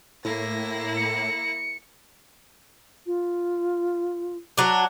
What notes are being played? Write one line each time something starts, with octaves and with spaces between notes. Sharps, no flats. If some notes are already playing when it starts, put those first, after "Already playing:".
A2 A#3 E4 A#6
C#7
F4
F#3 D4